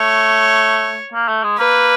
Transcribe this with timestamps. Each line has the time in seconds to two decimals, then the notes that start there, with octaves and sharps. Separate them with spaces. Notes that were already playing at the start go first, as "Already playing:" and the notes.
Already playing: A3 C#5
1.13 A#3
1.28 A3
1.44 G#3
1.58 A#3 B4